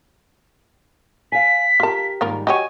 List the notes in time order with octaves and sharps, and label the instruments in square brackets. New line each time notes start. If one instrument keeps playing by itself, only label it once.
[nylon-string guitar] F5 G#5 [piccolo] B6
[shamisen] F4 A5 [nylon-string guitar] G4 A#4
[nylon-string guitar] G#2 D#3 G3 [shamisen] A#3 F4 A#4
[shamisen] F#3 G4 C#5 [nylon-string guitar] D#5 [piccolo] G#5